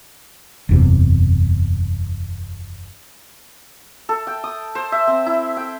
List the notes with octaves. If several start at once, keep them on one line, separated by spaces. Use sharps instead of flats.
F#1 E2 C3
A4
G5
D#6
C5
E5
C4
E4
G5